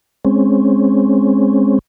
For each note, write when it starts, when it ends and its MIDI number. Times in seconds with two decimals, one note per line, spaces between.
0.25 1.79 56
0.25 1.79 60
0.25 1.79 61